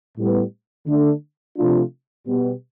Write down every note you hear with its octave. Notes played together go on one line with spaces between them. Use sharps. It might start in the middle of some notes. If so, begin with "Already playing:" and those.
A2 G3 B3
D3 A3 D4
C3 F3 A3 D4 F4
B2 G3 B3